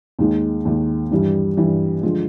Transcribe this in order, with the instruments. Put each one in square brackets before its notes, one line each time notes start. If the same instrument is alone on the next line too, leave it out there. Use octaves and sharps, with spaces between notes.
[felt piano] D#2 D#3 G#3
D#2 D#3 G#3
G2 E3 G3
G2 E3 G3
D3 F3 G#3